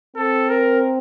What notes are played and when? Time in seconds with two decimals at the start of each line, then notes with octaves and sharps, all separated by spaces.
0.16 C4 A4
0.49 A#4